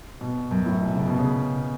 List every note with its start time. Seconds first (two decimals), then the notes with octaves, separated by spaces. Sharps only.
0.21 B2
0.51 F#2
0.66 A2
0.81 B2
0.96 C#3
1.07 B2
1.19 C#3